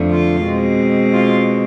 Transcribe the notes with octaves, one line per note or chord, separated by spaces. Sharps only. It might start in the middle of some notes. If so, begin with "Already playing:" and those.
Already playing: F2 D3 F3 A3
F4
B2 G#3 C4
F4